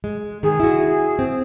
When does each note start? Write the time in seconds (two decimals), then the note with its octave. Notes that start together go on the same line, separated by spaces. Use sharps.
0.04 G#3
0.43 D#3 G#4
0.60 E4 F#4
1.19 C4